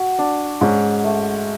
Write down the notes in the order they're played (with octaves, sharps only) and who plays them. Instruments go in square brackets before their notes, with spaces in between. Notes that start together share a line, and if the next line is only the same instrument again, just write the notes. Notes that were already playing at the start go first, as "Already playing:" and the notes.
Already playing: [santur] F#4
D4
[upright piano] G#2 [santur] C#4
[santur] A3